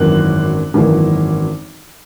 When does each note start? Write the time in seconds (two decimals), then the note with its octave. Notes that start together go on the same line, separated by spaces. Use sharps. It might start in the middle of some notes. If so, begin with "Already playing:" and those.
Already playing: G#1 F#2 E3 A#3 F#6
0.74 G#1 F#2 E3 A#3